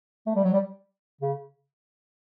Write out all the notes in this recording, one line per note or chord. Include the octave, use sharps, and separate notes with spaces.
A3
G3
F#3
G3
C#3